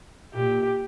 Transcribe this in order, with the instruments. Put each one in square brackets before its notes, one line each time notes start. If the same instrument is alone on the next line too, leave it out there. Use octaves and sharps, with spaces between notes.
[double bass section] A#2 [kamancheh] G4